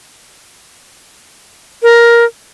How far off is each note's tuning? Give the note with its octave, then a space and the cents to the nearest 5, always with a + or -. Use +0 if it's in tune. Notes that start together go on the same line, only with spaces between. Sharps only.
A#4 +10